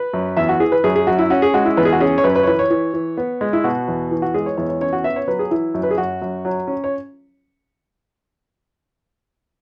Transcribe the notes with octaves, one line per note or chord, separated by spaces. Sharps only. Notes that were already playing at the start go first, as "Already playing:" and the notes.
Already playing: B4
F#2
E2 E5
F#4
E3 G#4
B4
F#2 G#4
G#4
F#2 F#4
E4
C#4 F#4
G#4
G#3 F#4
E4
E2 B4
G#4
F#4
C#4 G#4
C#5
F#2 B4
B4
C#5
E3 B4
C#5
E3
E3
B3
G#3
E4
B2 F#4
E2
E3
F#4
G#3 G#4
C#5
E2 C#5
C#5
C#4 C#5
F#4
B3 E5
C#5
F#3 B4
G#4
E3 E4
F#2
B4
G#4
F#2 F#4
F#2
F#3
C#4
C#5